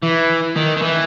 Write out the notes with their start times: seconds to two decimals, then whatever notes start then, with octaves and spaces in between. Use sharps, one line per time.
0.02 E3
0.56 D#3
0.77 D#3
0.82 E3